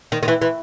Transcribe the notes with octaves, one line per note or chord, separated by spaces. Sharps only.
D#3
D#3
E3
E3